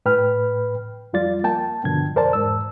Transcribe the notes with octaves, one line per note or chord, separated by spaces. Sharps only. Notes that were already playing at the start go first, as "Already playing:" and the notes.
A2 B4 G5 B5 F6
F2 F3 G3 F4 D5 A6
A#3 G5 A5
G2 B2 D3 F3 G#6
F2 A#4 C5 D5 A5
E2 G#2 E6